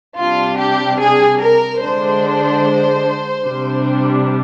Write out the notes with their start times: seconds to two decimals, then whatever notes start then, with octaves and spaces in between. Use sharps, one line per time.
0.18 C3 G3 D4 F4
0.59 G4
1.00 G#4
1.41 A#4
1.81 D3 G#3 D4 C5
3.45 C3 G3 D4